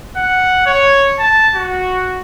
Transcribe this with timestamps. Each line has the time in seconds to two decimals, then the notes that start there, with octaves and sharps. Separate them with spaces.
0.17 F#5
0.66 C#5
1.19 A5
1.55 F#4